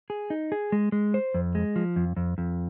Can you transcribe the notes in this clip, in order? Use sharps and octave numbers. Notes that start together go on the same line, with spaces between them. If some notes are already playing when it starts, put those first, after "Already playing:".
G#4
D#4
G#4
G#3
G#3
C5
F2
G#3
F3
F2
F2
F2